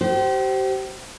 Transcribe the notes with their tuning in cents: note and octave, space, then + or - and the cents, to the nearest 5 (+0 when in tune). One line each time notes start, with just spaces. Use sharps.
G4 -35 C5 +0